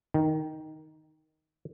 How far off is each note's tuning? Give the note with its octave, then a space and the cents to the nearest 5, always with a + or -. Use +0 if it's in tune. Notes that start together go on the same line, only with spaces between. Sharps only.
D#3 +5